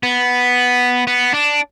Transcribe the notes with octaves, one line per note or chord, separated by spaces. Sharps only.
B3
B3
D4